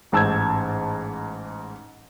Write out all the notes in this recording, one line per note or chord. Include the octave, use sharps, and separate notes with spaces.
A1 G#2 A5 E6 G6 G#6